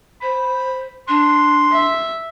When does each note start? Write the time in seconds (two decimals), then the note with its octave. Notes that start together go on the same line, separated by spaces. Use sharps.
0.21 C5 B5
1.08 D4 C6
1.72 E5